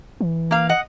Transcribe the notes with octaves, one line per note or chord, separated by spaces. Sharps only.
E3
A#3 F5
D#5 F#5